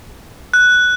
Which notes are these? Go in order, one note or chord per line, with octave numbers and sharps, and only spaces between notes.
F#6